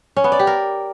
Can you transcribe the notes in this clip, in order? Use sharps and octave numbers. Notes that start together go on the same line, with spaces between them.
C#4
B3
D5
G4
A#4